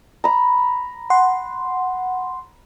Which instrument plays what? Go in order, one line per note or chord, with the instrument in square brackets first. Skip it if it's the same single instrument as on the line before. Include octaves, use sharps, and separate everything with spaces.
[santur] A#5 B5
[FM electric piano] F#5 C6